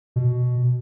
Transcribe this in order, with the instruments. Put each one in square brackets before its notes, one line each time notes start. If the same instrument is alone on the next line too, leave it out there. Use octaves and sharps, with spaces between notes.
[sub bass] B2